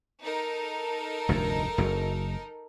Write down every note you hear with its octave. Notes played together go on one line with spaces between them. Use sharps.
D#4 A4 A#4
F1 D2 G2
F#1 F#2